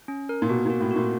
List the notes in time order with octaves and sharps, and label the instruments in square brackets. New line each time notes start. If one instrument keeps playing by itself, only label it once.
[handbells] C#4
A#4
[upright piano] A#2
[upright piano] B2 [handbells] F#4
[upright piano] A#2 [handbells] F#4
[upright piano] A2
[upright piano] A#2 [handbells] F#4